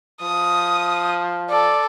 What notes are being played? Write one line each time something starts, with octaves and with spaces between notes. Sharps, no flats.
F3 D#6
A4 D5